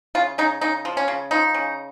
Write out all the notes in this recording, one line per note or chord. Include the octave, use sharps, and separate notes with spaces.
C#3 F4
C#3 D#4
C#3 D#4
F3
C#4
C#3
F3 D#4
C#3